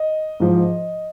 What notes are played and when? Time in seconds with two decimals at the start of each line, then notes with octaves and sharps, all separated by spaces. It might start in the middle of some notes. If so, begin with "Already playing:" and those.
Already playing: D#5
0.40 G#2 F3